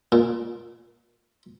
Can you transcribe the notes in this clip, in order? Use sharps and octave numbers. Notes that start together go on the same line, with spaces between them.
A#2